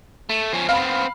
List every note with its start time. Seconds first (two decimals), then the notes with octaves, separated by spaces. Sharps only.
0.30 A3
0.53 F3 C#4
0.69 B3 C4 F5 B5